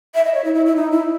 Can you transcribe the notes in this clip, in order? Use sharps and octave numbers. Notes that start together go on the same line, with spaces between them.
E5
D#5
C#5
E4
E4
E4
D#4
E4